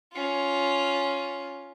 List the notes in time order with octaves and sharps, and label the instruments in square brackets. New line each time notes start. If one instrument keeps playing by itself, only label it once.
[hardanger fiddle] C#4 F4